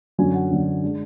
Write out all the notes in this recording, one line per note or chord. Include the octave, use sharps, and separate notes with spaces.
F#2 D3 F#3 C#4 G#5
F#5
F#2 D3 F#3 C#4
G#3 D4